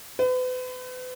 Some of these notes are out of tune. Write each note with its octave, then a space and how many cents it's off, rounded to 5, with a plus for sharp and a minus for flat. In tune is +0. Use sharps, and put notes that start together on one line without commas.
B4 +40